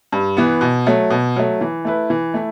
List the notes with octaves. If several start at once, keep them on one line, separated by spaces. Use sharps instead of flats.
G2
E3 B3
B2
F#3 A3
B2
F#3 A3
E3
A3 E4 B4
E3
A3 E4